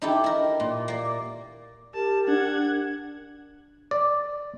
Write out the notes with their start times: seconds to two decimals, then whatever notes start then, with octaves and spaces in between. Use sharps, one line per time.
0.02 D#4 E4 G4 A4
0.24 E4 A#4
0.60 A#2
0.88 A#3 D5
1.94 G4 A#4 A5
2.28 D4 F#5 G#6
3.91 D5